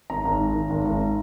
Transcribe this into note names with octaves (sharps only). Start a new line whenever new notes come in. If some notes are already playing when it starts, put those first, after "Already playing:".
G#1 A#5
G#1
G#2
D#3
G#1
G#1